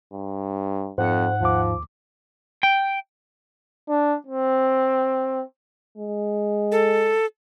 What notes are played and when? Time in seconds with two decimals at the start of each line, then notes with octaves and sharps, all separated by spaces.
0.13 G2
0.98 F2 G#2 C5 F#5
1.41 D#2 F3 D6
2.63 G5
3.89 D4
4.27 C4
5.97 G#3
6.72 A4